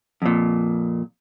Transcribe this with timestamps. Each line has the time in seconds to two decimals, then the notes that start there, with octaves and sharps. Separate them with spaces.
0.22 F2 A#2